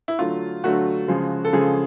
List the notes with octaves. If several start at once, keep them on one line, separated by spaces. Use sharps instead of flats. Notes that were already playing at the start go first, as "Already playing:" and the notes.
E4
D3 F#3 A3 F4
D3 F#3 A3 F#4
C#3 F3 G#3
A4
C#3 F3 G#3 G#4